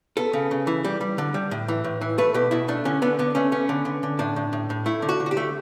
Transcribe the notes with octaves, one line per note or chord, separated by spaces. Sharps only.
B3 A4
C#3
C#3
E3
G3
G3
D3
G3
A2
E3
A2
E3
A3 B4
B2 G4
B2 E4
A3 D4
D3 C#4
D3 B3
D3 B3
A3 C#4
B3 C#4
D3
D3
D3
A2 D4
A2
A2
A2
A3 E4
D3
F#4
D3
F#4
G4
A3